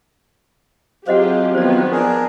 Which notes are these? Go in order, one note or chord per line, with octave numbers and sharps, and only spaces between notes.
F#3 C4 F4 G4 G#4 C5 D#5 F#5
D#3 F3 B3 C5 D5
D4 G#4 A#4